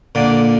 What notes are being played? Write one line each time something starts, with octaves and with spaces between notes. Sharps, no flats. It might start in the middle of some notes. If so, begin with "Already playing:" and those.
A#2 D3